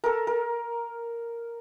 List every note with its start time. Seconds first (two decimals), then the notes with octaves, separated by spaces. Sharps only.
0.04 A4 A#4
0.27 A#4